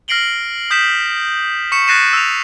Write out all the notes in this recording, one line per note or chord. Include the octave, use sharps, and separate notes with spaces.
F6 A#6 C7 D7 F#7 G7
D#6 G6 B6 E7 F#7
C#6 B6 C#7 E7
F#6 A6 A#6 C7 D#7 E7
E6 F7